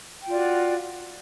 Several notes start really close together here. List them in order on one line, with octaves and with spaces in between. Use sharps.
G5 F4 D5 F#4